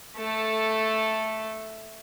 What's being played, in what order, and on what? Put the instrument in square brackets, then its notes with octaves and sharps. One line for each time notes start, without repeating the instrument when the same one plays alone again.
[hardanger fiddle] A3 A4